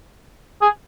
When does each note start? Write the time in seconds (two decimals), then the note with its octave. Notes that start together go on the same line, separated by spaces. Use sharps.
0.62 G#4